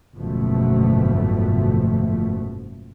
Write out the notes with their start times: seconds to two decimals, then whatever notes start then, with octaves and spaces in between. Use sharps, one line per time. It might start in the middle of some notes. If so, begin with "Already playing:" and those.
0.18 F#1 D2 G#2 B2 F3 A3